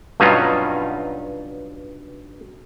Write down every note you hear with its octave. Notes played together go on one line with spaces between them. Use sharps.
G2 B2 F#3 C#4 D#4 F4